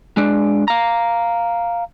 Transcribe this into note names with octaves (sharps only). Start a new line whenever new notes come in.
G#3 D4
F5 A#5